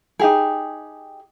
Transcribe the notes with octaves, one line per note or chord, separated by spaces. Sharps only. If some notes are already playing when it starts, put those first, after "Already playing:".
D#4 G4 G#4